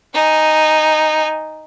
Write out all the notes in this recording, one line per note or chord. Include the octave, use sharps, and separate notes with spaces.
D#4 G#5